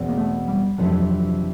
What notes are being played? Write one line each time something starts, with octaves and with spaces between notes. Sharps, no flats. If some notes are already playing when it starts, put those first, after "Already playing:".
Already playing: E2 B2 G#3 C4
A#3
A3
G3
F2 C3 E3 F#3 A3 D4